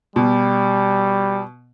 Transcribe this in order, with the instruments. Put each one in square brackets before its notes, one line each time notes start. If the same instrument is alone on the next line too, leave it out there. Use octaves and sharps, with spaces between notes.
[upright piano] B2 [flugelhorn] G3